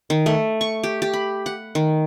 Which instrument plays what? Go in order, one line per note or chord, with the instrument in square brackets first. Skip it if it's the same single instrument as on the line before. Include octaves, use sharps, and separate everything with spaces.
[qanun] D#3
A3
C#6
G4
G4
B5
F#5
D#3